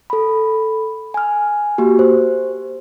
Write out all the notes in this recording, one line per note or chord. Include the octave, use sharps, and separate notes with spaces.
A4 B5
G#5 F6
A#3 F#4 G4
C5